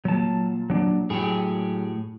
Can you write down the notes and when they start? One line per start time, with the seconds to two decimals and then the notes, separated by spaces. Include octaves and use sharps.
0.05 A#2 F#3 A5
0.70 F#3 D4
1.10 A2 F#3 G4 G#4